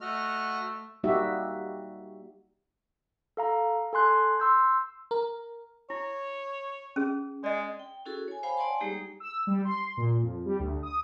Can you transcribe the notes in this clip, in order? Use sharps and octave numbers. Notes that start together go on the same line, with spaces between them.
A3 F#4 D#5 F6
G3 A#3 D#4 F#4 G4 E5
A4 F5 A#5
A4 G#5 C6 F#6
C6 E6 G6
A#4
E4 C#5
C#4 G#4
G#3 D5 D#5
G5
C#4 E4 F#4 G#4 A4
C#5 G#5
C5 C#5 F5 G5 G#5 B5
C#5 D5 F#5 G#5 A5 C6
G3 G#3 A#3 D#4 G4 G#4
E6
G3
C6
A#2
F2
G3
D2
D#6